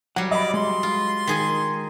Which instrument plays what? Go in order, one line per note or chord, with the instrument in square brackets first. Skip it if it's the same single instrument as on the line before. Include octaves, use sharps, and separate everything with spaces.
[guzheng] F#3 G3 [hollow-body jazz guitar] F#5
[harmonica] D5 [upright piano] D#5 B5
[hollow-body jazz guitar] G#3 [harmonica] C6
[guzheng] F4
D#3 G#4 G#5